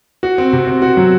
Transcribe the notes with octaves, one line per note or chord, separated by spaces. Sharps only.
F#4
C4
C3
C4
F#4
F#3